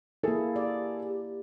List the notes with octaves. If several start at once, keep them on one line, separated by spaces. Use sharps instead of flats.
A#3 E4 G#4 A4
G4 D5